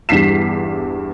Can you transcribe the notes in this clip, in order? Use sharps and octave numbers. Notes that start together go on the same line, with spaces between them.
E2 G2 B6 C7 E7